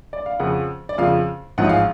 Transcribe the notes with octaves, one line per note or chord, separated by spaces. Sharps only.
D5
F5
F2 C#3 F3 F#5
D5
F2 C#3 F3 F5
A1 G#2 F3 G#3 F#5
F5